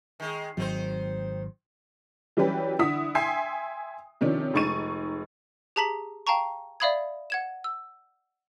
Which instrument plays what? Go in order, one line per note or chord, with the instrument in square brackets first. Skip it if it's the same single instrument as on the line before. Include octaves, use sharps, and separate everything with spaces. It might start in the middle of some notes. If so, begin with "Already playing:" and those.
[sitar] D#3 G#3
[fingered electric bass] G#1 F#3 [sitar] D#3 C4 C5
[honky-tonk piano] E3 F#3 G3 C#4 G4 B4
D3 E4 F#5 D#6 B6
E5 G5 G#5 C6 C7
C3 D#3 F3 C#4 D4
F1 G#3 D#4 C#6 A6 D#7
[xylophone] G4 G#4 A5 A#5 B6 F#7
F5 G5 A5 A#5 C#6
D5 E5 F5 B5 D#6 G#6
F#5 G#6 E7
E6